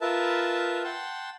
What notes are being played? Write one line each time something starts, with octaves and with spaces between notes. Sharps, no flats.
F4 A#4 B4 E5 A5
F#5 G5 A5 C6